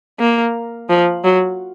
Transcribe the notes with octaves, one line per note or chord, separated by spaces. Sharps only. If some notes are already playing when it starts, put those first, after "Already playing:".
A#3
F3
F#3